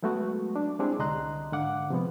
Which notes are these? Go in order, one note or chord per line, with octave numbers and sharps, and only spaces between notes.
F#3 G#3 A3 B3 F#4
D4
G#3 C4 D4 E4 G4 G#4
C2 D3 D#5 A#5 C6 F#6
G#2 D3 F5 F#5 D6
C3 F3 G#3 B3